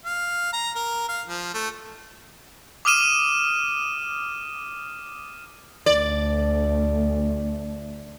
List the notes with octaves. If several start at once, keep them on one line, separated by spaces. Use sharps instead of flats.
F5
A#5
A#4
F5
F3
A3
D6 D#6 F6 D#7 E7
D2 A3 D5